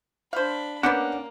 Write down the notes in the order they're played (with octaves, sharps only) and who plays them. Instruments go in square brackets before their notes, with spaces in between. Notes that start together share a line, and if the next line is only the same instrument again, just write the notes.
[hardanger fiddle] D4 B5 [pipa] C5 F5
[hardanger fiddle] A#3 [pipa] B3 G4 [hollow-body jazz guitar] C#4 D4 [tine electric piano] F#5